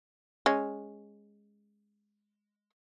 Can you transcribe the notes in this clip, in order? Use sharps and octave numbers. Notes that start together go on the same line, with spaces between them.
G#3 C#4